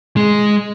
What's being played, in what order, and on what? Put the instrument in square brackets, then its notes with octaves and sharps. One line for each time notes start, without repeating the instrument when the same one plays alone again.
[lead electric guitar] G#3